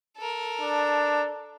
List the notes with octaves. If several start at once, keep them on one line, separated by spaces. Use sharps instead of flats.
A4 A#4
D4